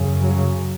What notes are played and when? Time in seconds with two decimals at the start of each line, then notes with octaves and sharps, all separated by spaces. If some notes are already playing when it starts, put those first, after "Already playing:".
Already playing: F#2 C#3
0.21 F#3